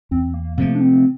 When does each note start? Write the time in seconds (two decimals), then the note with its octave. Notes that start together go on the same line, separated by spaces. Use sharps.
0.11 E2 C4
0.34 A#3
0.57 C3 F3 A3 A#3
0.75 D4
0.81 C4